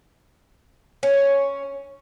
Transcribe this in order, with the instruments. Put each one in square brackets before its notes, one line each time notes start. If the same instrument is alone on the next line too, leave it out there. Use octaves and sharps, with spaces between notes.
[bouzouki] C#4